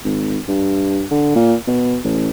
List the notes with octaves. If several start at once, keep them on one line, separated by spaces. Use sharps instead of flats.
G#1
G2
D3
A#2
B2
A1